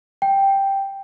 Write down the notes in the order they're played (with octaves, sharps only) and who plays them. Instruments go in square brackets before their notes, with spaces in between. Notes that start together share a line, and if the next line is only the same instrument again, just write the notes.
[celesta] G5